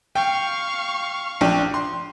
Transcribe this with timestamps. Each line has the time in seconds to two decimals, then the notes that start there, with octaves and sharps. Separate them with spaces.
0.15 F5 G5 C#6
1.41 A#1 D4 G5
1.74 C6